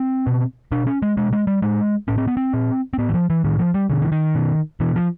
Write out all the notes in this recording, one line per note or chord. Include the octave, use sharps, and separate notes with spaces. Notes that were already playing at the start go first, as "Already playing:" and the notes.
Already playing: C4
B2
B2 D4
C#4
G#3
B2 G#3
G#3
G3
A2 G#3
A2 C#4
C4
B3
C4
A#2
C4
A2 B3
E3
F3
E3
A2 D#3
F3
G3
B2 D3
E3
D#3
B2
B2 E3
F3